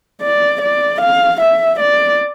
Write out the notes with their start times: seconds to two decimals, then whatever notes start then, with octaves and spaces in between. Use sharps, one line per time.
0.22 D5
0.61 D5
1.01 F5
1.41 E5
1.80 D5